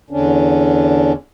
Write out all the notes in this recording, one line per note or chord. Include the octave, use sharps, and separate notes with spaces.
E2 D3 C#4 D4